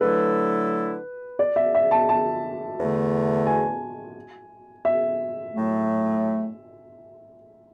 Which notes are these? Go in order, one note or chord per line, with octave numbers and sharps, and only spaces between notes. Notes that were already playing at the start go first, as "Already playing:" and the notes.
D3 F#3 A3 E4 A4 B4
D5
E5
E5
A5
A5
E2 D3 A3
G#5
E5
A2 F#3 A3